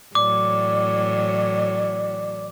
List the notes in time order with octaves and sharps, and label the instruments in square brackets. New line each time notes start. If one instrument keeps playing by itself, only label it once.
[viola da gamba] A2 E3 F#3 [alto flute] D5 [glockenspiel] D6